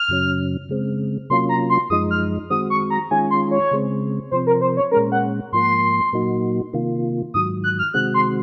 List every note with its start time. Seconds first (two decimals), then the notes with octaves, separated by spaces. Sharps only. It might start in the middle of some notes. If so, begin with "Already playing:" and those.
Already playing: F6
0.08 F#2 C#3 F#3 C#4
0.69 C#3 G#3 C4
1.30 C3 F#3 A#3 C#4 F4 C6
1.49 A#5
1.70 C6
1.90 F#2 F3 G#3 D#4 D#6
2.11 F6
2.50 D#3 G#3 C4 F#4 D#6
2.70 C#6
2.90 A#5
3.11 D#3 G#3 C#4 F4 G#5
3.31 C6
3.51 C#5
3.71 C#3 G#3 C4
4.31 C3 F3 C4 C5
4.47 A#4
4.61 C5
4.77 C#5
4.91 A#2 G#3 C#4 A#4
5.12 F#5
5.52 G#2 F3 A#3 C6
6.13 A#2 F#3 A#3 D#4 F#4
6.73 C3 D#3 A#3 F4
7.34 G#2 D#3 F#3 D#6
7.64 F#6
7.79 F6
7.94 C3 D#3 G#3 C4 F#4 F#6
8.14 C6